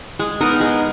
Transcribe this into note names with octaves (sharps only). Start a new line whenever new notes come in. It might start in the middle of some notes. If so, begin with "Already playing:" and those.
G#3
B3 D#4 A#4
G#3